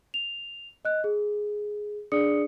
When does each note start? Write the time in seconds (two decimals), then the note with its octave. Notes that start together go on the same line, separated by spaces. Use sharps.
0.14 F7
0.85 D#5 F#6
1.04 G#4
2.12 D4 G#4 D5 D#6 C#7